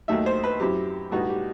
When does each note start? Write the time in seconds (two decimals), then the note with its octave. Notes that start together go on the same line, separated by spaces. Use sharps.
0.08 D#2 D#3 F#3 A3 D#4 E5
0.26 C5
0.44 B4
0.60 F#2 F#3 C4 E4 G4
1.11 B1 A2 G3 B3 D#4 F#4
1.29 G4